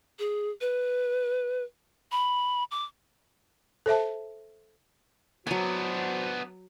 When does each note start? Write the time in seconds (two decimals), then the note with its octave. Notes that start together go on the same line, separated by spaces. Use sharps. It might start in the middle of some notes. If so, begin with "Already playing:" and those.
0.19 G#4
0.61 B4
2.12 B5
2.71 D6
3.86 A4 C5 E5 A5
5.47 F#3 B3 D4 F#4 C5 G#5